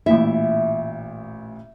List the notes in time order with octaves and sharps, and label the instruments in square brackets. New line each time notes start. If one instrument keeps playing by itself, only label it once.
[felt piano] A1 A#2 E4 [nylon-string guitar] E5